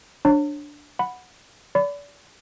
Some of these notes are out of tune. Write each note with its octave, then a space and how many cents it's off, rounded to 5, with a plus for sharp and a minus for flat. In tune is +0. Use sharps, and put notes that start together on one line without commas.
D4 +0 C#5 -25 A5 +45
F#5 -10 B5 +0
D5 -35 B5 +25